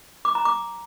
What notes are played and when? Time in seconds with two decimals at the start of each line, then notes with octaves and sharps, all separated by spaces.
0.25 D6
0.35 A#5
0.45 D6